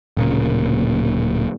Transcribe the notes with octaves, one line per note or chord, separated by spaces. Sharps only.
D1 A#2 C#3 A#3